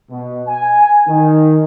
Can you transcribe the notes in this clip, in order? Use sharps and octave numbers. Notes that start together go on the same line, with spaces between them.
B2
G#5
D#3